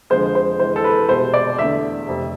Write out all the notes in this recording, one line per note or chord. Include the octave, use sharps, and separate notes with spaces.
F2 D3 F3 G#3 C5
C5
F2 E3 G#3 C5
A4
B4
C2 B2 G#3 C5
D5
E2 D3 A3 E5
F1 F2 C3